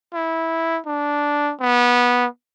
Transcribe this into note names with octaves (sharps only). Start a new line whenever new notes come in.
E4
D4
B3